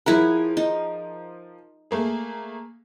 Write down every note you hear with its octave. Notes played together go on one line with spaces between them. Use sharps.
F3 E4 G#4 A#4 F#5
D#4
A3 A#3 G#4